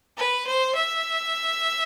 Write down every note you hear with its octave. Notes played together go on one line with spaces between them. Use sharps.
B4
C5
E5